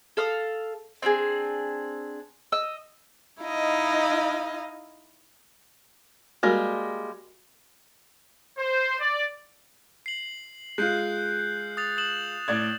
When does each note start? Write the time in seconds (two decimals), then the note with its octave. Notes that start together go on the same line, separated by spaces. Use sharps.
0.17 A4 F5 D#6
1.02 C4 D4 F4 G#4
2.52 D#5 E6
3.43 D#4 E4 D#5 F5
6.43 G3 G#3 A#3 F#4 A#4
8.58 C5
9.00 D5
10.06 C7 F#7
10.78 G#3 F4 F#6 G6 C7
11.77 D#6 A6 F7
11.98 D#6 E7 F#7
12.48 A2 D5 G#6